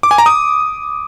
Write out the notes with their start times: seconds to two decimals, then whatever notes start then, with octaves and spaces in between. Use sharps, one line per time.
0.03 D6
0.11 G#5
0.18 A#5
0.26 D#6